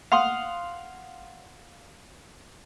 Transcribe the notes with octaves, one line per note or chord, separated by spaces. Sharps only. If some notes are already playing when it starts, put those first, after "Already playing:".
F5 F#5 C6 D#6